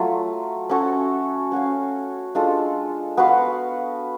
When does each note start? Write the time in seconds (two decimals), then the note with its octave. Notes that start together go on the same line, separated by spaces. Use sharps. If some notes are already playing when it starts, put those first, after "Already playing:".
Already playing: F#3 A3 F4
0.69 C#4 F#4 A4 C#5
1.52 C#4 F#4 C#5 F5
2.35 G#3 D4 F4 A4
3.17 B3 F#4 B4 F5